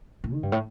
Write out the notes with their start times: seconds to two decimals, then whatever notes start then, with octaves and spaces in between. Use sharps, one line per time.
0.24 A2
0.33 D#3
0.43 G2
0.52 A2